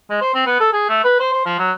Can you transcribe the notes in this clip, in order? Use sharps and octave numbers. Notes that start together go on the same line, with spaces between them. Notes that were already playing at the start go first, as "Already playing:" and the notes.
G#3
C5
C4
B3
A4
G#4
A3
B4
C5
C5
F3
F#3